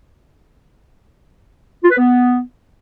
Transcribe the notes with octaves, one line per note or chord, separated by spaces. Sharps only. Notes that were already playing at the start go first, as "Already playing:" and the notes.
F4
B4
B3